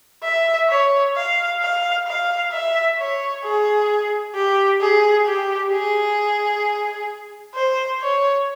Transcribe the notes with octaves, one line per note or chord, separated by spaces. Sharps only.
E5
C#5
F5
F5
F5
E5
C#5
G#4
G4
G#4
G4
G#4
C5
C#5